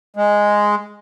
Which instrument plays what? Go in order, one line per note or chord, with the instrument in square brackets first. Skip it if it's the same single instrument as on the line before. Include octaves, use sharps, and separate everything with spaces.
[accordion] G#3